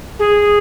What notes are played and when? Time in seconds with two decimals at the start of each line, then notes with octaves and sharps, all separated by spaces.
0.19 G#4